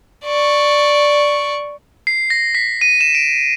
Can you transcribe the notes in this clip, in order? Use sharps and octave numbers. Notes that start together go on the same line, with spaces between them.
D5 C#6
C7
A#6
B6
D#7
E7
D7